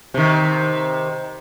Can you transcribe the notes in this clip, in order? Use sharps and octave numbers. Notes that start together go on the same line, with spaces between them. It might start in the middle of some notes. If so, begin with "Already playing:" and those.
C3 D#3